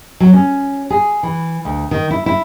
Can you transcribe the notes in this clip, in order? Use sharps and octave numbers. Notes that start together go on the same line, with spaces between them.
F#3
C#4
G#4
E3
D2
D#3
E4
E4